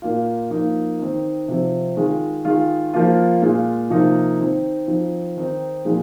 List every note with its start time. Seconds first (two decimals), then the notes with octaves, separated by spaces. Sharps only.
0.02 A#2 A#3 F4
0.50 F3 A#3 D#4
0.99 D#3 C4 D#4
1.48 C3 F3 C4
1.96 D#3 G#3 F4
2.45 D#3 G#3 F4
2.94 F3 A#3 F4
3.42 A#2 G#3 F4
3.90 C3 F3 A#3 D#4
4.39 D#3 C4 D#4
4.87 F3 C4 D#4
5.37 D#3 C4 D#4
5.85 A#2 F3 G#3